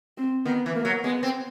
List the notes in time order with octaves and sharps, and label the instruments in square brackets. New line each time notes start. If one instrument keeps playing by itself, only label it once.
[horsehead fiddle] C4
[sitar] D#3 [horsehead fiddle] B3
[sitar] E3
[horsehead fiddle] A#3
[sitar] F#3
[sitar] G#3 [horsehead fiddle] B3
[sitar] C4